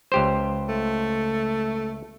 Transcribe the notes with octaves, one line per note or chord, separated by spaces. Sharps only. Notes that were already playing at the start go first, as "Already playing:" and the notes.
C#2 G4 C5
A3